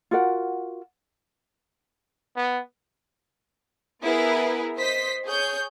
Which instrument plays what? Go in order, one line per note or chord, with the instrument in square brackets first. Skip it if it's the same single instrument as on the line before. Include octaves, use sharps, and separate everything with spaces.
[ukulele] F4 F#4 A#4 F#5
[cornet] B3
[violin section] B3 E4 G#4 A#4 B4
C5 D#5 B6
G#4 C#5 G6